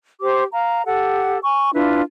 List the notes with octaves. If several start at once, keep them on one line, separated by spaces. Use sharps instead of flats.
G4 C5 D6
F5 A#5
G4 A4 F#5
G#5 C#6
D4 E4 F4 B4